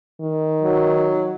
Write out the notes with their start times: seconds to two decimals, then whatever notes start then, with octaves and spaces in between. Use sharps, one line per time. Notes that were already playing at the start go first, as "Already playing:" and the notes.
0.21 D#3
0.61 F#3